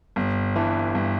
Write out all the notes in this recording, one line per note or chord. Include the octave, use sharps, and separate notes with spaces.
G1
G2 E3
G1